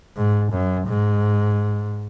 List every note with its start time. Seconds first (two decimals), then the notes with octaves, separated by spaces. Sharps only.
0.17 G#2
0.52 F#2
0.88 G#2